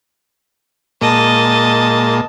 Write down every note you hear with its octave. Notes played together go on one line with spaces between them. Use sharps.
A#2 G#3 A#3 D#5 A5